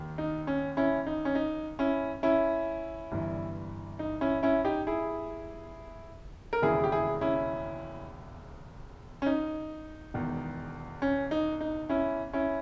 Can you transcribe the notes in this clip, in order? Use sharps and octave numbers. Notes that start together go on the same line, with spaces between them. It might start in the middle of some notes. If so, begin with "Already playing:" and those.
Already playing: D#2 D#3
D#4
C#4
C#4 E4
D#4
C#4
D#4
C#4 E4
C#4 E4
G1 G2 E3
D#4
C#4 E4
C#4 E4
D#4 G4
E4 G#4
A#4
E1 D#2 C#3 E3 E4 G#4
G4
E4 G#4
C#4 E4
C#4
D#4
E1 E2 D#3
C#4
D#4
D#4
C#4 E4
C#4 E4